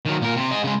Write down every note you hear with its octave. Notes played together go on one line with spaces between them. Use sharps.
D#3 F#3
A#2 A#4
C3
D#4 G#4
C#3 G#3